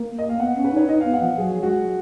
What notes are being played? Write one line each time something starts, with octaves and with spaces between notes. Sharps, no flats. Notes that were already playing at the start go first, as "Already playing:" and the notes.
Already playing: A#3
D#5
F5
B3 F#5
C#4
B4
D#4 C#5
D#4 D#5
B3 F5
F#5
F3
F#3 G#4
G#3 F#4